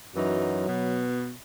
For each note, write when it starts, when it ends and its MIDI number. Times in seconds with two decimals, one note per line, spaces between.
0.16 0.65 42
0.16 0.65 52
0.16 1.06 54
0.16 0.65 63
0.68 1.33 47
0.68 1.33 59